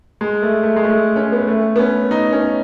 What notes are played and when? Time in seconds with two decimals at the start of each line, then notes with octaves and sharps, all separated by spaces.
0.21 G#3
0.42 A3
0.63 A3
0.76 G#3
0.85 A3
1.16 C#4
1.32 B3
1.47 A3
1.76 B3
1.79 C#4
2.11 D#4
2.33 C#4